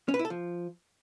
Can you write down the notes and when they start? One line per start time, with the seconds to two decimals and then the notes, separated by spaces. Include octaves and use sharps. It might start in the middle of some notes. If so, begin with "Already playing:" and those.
0.08 C#4
0.14 B4
0.19 E4
0.25 A4
0.30 F3